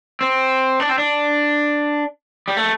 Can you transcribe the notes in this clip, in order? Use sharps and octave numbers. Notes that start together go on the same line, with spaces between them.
C4
D4
C4
D4
G3
A3